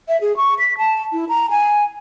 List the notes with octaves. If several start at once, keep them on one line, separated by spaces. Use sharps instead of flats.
E5
G#4
C#6
B6
A5
E4
A#5
G#5